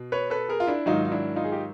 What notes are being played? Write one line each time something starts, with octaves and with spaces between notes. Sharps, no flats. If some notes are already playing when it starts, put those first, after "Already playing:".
Already playing: B2
B4 C#5
A4 B4
G#4 A#4
F4
D4 E4
G#2 D#3 F#3 D#4 F4
D#4
D4 E4
D#4 F4
G#4
G4